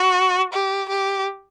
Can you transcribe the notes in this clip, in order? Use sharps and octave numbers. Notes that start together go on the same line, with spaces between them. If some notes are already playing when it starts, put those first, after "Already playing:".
Already playing: F#4
G4
G4